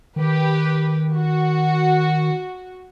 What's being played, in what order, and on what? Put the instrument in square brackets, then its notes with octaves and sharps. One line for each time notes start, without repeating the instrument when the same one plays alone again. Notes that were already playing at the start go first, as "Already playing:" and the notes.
[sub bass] D#3 [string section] G4 B4
[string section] F#4